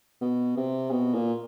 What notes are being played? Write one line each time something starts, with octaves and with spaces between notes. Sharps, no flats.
B2
C3
B2
A#2